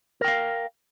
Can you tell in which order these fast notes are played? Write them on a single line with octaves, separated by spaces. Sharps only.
A#4 G5 F5